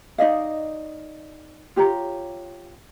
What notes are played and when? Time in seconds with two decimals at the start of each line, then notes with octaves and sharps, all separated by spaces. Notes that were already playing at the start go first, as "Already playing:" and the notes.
0.18 D#4 D5 D#5 F5
1.76 F4 G4 C#5 A#5